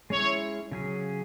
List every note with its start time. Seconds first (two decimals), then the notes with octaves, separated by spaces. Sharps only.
0.10 G#3 C#4 E4 C#5
0.71 C#3 F#3 C#4 G#4